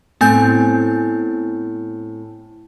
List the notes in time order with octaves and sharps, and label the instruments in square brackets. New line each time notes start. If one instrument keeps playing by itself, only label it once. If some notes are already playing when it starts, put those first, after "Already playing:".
[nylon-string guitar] A2 C4 [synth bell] B3 G#5 G6